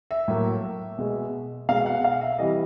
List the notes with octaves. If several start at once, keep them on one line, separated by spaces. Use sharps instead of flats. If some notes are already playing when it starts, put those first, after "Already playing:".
E5
A2 F#3 A#3
B2 G#3
B2 G#3 F5
F#5
F5
E5
C3 E3 G3 D#5